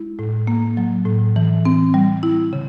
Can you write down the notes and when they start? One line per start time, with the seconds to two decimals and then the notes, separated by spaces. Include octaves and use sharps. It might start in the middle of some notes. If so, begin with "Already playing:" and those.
Already playing: G#3 E4
0.19 A2
0.47 A#3
0.77 F#3
1.06 A2
1.36 E3
1.65 C4
1.94 G3
2.23 E4
2.53 C#3